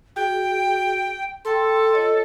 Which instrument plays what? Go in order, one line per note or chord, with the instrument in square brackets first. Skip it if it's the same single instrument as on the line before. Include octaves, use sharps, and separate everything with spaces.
[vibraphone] F#4 G#4 [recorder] G5
[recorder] A4 [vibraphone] G5 C6
[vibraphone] F4 C#5 D#5